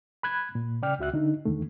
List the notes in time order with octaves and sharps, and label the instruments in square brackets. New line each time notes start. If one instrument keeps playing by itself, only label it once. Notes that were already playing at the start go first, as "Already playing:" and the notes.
[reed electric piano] B5 F#6 G#6
A#2
C#3 D5 G5 F6
C#2 F#4 E5 F#6
D3 D#4
E2 D3 D#3 A3